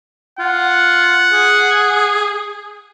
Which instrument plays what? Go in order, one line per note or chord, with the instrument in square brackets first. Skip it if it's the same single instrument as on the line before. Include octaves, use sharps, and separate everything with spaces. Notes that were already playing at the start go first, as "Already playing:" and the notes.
[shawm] F4 [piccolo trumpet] F#5
[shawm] G#4